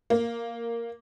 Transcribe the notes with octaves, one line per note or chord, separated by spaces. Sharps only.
A#3